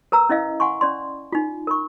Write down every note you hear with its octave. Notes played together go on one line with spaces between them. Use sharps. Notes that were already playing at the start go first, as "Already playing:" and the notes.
A#4 B4 A#5 E6
C#4 E4 D#5 F5
F#5 G#5 C6 C#6
C#4 D5 C6
D#4 F4
A#4 B5 C#6